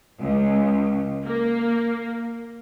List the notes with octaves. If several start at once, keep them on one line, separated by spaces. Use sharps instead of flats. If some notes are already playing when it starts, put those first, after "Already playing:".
C#2
A#3